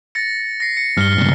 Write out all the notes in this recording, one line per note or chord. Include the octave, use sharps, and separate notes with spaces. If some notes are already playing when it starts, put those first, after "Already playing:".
A6 A#6 C#7
A#6 C7
C#7
G2 F6 G7
C#2 G2